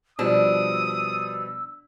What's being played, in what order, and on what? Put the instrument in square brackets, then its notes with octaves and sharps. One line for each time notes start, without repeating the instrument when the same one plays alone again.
[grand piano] B2 F3 G3 [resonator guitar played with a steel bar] D4 [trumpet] D#6 [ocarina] E6